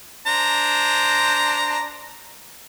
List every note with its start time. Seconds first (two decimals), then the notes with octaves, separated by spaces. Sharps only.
0.27 D4 C5 A#5